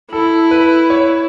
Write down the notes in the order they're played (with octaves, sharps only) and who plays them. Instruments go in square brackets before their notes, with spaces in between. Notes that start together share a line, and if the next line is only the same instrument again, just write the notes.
[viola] E4 [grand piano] A4
[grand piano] B4
C#5